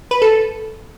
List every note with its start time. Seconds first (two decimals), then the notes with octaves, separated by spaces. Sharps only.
0.11 B4
0.22 A4